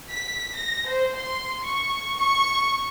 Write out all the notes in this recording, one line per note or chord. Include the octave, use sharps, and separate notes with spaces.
B6
A#6
C5
C6
C#6
C#6